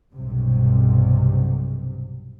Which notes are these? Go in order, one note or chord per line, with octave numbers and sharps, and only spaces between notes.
B1 G2 C3